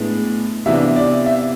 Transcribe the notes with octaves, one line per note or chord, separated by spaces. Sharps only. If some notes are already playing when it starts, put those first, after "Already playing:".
Already playing: A2 G#3 B3 D4
C3 E3 B3 D4 E5
D5
E5